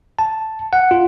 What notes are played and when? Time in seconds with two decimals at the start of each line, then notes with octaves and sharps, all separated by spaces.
0.19 A5
0.73 F#5
0.91 F4